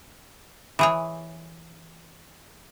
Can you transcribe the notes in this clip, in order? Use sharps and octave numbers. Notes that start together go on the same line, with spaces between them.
E3 G#4 C#5